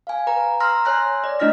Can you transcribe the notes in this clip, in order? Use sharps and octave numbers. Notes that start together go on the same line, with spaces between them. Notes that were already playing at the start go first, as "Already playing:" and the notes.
F5 G#5
B4 A#5
A#5 C6 E6 F6 A#6
C#5 G#5 C6 F#6 A#6
D5
A3 D4 E4 D#5 F6 A#6